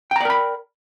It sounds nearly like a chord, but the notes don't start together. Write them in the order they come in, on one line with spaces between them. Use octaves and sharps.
G5 A#5 D5 A#4 B5